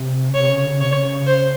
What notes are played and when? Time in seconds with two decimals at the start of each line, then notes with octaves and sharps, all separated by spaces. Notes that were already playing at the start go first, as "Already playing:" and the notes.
Already playing: C3
0.29 C#3
0.34 C3 C#5
0.50 C#3
0.66 D3
0.73 C#3
0.81 C3 C#5
0.89 C#3
1.27 C5